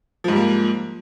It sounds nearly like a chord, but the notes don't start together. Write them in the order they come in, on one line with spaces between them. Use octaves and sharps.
F3 G#2 G3 A#3